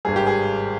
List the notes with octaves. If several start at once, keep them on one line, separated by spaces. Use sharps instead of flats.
G#1 G2 G3 G#4
G4
G#4